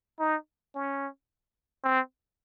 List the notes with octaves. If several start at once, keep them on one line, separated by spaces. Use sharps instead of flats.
D#4
C#4
C4